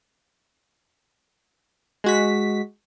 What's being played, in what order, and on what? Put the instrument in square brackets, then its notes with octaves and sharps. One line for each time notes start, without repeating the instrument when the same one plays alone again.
[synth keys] G#3 F#4 B6